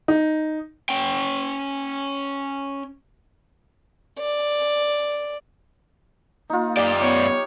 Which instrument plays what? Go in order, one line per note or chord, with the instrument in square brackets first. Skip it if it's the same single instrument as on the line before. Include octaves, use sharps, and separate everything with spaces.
[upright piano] D#4
[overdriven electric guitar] C#4 G5
[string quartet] D5
[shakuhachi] A#3 [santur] D#4 F4
[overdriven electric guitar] F#2 D5 [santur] G4
[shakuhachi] B3 [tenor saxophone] C#5